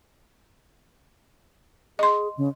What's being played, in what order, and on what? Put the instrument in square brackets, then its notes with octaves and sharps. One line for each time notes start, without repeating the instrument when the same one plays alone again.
[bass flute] G#4 [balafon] D#5 C6
[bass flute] C#3